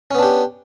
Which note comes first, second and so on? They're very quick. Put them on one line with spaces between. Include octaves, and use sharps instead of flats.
C#4 B3 D4 G4